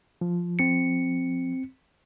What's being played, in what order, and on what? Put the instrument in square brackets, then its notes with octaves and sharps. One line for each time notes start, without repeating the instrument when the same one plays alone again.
[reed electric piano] F3
[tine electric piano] C4 C#7